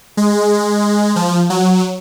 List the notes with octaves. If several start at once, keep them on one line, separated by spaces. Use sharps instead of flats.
G#3
F3
F#3